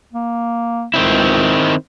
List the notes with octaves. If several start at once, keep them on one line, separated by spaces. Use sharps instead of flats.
A#3
C#2 D#3 C4 E4